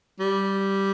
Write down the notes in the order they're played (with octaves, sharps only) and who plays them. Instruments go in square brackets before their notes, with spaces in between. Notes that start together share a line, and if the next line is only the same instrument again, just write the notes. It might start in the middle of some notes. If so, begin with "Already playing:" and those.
[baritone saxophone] G3